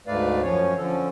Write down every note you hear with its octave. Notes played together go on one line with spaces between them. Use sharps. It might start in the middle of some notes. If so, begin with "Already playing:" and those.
D2 G#2 A3 B4 D5 F5
F#2 F3 C#4 C#5
D3 F3 C#4 A4